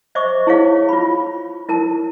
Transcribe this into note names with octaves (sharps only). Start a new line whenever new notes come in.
C5 D#5 E5 C#6 D6
E4 G#4 C#5 F5
F4 B5
E4 A#4 A5